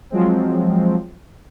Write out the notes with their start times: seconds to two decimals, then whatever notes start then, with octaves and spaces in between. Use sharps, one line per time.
0.10 F3 F#3 G#3 C4